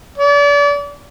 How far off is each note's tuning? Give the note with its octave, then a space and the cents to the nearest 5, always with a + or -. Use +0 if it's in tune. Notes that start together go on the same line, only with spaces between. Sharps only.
D5 -35